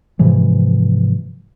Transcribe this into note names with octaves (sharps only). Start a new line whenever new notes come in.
G#2 C3 E3 F3